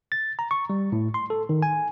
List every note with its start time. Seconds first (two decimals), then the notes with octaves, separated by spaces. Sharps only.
0.12 A6
0.39 A#5
0.51 C#6
0.70 G3
0.92 A2
1.14 C6
1.30 A4
1.49 D#3
1.62 G#5